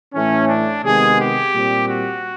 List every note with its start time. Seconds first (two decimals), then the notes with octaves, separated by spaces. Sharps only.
0.14 A2 E3 A3 C#4
0.49 D4
0.84 C3 D#3 G#3 B3 G#4
1.19 G4
1.55 A#2 G3 C4
1.89 F#4